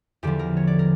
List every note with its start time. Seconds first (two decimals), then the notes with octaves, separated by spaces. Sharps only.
0.23 E2 D3 F3 G4
0.39 A#4
0.57 C#5
0.67 D5
0.79 A#4